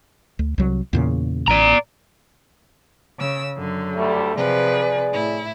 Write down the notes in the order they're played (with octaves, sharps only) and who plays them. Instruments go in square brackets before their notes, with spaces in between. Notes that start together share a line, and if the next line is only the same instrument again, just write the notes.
[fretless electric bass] D2
C2 F#3
E2 A#2 C#3
[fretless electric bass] A1 [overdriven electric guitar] D5 A#5
[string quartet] C#3 E6
F#2 D3
[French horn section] D2 G3 A3
[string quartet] C3 F3 B4 [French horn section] G#4 D5
[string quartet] A2 E4